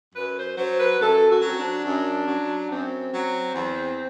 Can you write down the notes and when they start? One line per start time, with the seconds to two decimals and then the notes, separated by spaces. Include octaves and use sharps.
0.14 F#2 B4
0.37 C5
0.57 F#3 C5
0.79 B4
0.99 F#2 A4
1.28 F#4
1.42 F#3
1.47 C4
1.57 D4
1.85 F#2
2.27 F#3
2.70 F#2 C4
3.13 F#3
3.55 E2